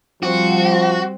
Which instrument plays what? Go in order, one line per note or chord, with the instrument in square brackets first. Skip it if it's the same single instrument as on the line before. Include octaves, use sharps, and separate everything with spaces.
[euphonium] F3 [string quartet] G3 C4 [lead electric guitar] F#4